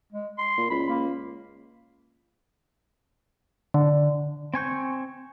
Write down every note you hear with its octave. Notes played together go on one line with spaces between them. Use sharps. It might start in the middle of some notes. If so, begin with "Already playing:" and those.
G#3
C6
A#2
C#2 B5
A#3
D3
C4 G#5 C#6 G6